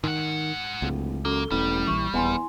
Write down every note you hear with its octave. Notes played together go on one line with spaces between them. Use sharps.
G#2 D#3 F#5
D1 C#2
F#2 A#3 A4 G7
E1 A1 G3
A#1 E3 C#6
D#1 E2 E4 G#5 C6